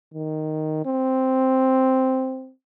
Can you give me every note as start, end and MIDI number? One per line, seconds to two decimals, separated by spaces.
0.14 0.82 51
0.86 2.51 60